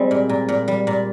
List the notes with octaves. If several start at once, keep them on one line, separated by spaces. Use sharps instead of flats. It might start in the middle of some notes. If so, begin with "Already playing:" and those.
Already playing: G3 G#3 C4
A#2
A#2
A#2
G3
A#2